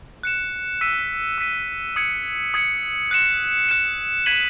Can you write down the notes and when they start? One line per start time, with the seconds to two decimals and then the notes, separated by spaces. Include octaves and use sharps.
0.23 F#6 C#7 E7
0.81 E6 B6 D#7
1.38 E6 B6 D#7
1.96 D#6 G#6 C#7
2.54 D#6 G#6 C#7
3.11 F#6 C#7 E7
3.69 F#6 C#7 E7
4.26 G#6 B6 D#7 F#7